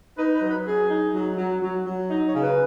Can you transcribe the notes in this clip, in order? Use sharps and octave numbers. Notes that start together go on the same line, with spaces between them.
D#4 B4
B4
F#3
B4
F#3 G#4
D#4
F#3
F#3
F#3
F#3
D#4
C#5
C#3
B4